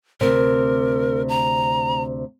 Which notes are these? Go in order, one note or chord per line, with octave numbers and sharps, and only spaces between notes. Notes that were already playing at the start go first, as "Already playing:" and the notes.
D2 C3 A#4
A#5